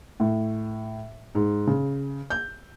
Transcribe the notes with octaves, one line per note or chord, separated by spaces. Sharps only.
A2
G#2
C#3
G6